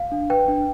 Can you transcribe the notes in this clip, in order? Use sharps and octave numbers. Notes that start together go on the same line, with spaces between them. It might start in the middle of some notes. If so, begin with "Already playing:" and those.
Already playing: F5
D4
B4 G5
D4